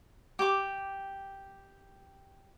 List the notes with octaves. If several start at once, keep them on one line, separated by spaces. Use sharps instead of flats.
G4 D6